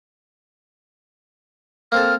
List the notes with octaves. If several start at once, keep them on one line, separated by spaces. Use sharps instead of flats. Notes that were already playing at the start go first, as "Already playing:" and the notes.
A#3 C4 A4 F6